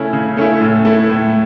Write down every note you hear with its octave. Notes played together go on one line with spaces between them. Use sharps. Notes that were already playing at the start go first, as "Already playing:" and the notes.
Already playing: C#3 A3 C#4 E4
C#3
A3 C#4 E4
A2
A3 E4
A2